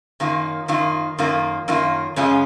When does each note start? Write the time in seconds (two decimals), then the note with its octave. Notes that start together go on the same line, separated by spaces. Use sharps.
0.20 F#2 D#3 A#3 F4
0.68 F#2 D#3 A#3 F4
1.19 F#2 D#3 A#3 F4
1.68 F#2 D#3 A#3 F4
2.16 F#2 C#3 G#3 C#4 F4